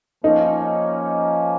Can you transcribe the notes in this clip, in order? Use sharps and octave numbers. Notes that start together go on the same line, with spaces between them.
F3 A#3 C#4 D#4